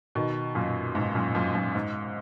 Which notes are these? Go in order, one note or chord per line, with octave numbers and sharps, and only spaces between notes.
B2 D#3
F#2 A#2
G#2 B2
F#2 A#2
F#2 A#2
F#2 A#2
G#2